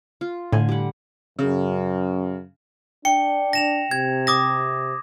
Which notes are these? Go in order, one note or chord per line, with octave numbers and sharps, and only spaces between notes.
F4
A2 D3 G#5
G3 F#5
F#2 C#3
D4 G5 C#7
A#6 E7 F7
C3 G#6
D6 D#6 A#6